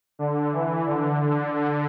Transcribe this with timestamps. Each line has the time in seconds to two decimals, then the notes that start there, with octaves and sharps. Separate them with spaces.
0.19 D3
0.53 E3
0.87 D3
1.20 D3
1.54 D3